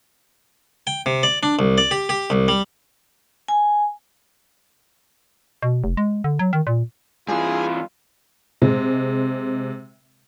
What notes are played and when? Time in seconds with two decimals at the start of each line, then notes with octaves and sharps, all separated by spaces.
0.87 G5
1.06 C3
1.23 D5
1.43 D4
1.59 C2
1.78 D5
1.91 G4
2.09 G4
2.30 C2
2.48 G3
3.48 G#5
5.62 B2
5.84 F1
5.97 G#3
6.24 D3
6.39 F#3
6.53 D#3
6.67 A#2
7.29 G2 E3 F4 G#4
8.62 C3 G#3